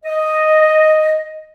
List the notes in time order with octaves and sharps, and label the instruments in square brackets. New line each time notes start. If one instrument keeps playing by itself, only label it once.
[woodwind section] D#5